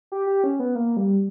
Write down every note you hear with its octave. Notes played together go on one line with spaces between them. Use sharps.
G4
G4
C#4
B3
A#3
G3